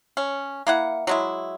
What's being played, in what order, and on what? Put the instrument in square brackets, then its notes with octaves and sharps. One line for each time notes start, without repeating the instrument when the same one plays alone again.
[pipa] C#4
A#3 E4 F#5
F#3 G#3 E4